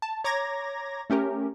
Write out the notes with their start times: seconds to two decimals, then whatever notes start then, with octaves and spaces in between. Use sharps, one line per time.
0.02 A5
0.24 C#5 A#5 D6 G#6 A#6
1.10 A3 C#4 G4 A#4